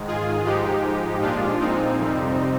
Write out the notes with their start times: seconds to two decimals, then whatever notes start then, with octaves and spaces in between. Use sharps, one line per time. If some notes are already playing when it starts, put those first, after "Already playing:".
Already playing: G#2 D#3 G#3
0.08 F4 G#4
0.46 G#2 F3 G#3 D#4 G4
1.22 A#2 F3 G#3 D4 F4
1.61 C4 D#4
1.99 F2 C3 G3